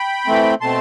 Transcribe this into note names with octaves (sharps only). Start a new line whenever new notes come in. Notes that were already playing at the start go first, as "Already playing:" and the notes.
Already playing: G5 B5
E3 A3 C4
B2 A3 C4 A5 C6